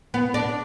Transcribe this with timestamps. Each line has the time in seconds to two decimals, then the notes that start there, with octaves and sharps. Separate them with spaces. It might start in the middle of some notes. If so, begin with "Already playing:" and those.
0.14 B3
0.34 D4